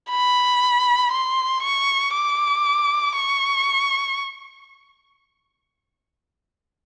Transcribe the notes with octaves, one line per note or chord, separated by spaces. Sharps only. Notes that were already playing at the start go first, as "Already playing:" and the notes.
B5
C6
C#6
D6
C#6